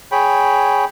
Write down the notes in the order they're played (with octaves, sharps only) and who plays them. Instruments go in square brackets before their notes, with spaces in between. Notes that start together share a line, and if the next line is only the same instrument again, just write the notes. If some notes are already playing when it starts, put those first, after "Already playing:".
[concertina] G#4 C#5 G5 B5